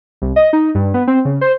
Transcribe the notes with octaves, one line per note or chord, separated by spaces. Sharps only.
C2
D#5
D#4
G2
B3
C4
C#3
C5